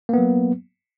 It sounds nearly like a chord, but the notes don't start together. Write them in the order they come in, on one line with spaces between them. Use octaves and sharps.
A#3 B3 F#3